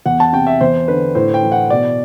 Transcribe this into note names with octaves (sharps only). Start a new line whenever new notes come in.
E2 F#5
A5
C3 G5
E5
E2 C5
D3 B4
A2 C5
G5
E3
F#5
B2 D5